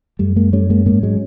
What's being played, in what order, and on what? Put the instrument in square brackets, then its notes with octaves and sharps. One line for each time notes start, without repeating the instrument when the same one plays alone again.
[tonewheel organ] F#2 [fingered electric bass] G3 A3
[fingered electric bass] G#3 A#3
[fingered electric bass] G3 A3 [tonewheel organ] C#4
[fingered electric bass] G#3 A#3
[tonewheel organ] G#2 [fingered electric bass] G#3 A#3
[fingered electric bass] F#3 G#3